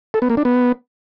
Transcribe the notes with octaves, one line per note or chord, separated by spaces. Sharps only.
A4
B3
A#3
D4
B3